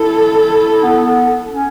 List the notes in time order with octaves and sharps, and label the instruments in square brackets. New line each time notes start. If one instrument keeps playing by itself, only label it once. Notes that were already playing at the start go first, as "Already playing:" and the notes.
Already playing: [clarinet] E4 [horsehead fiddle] A4
[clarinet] B3
C#4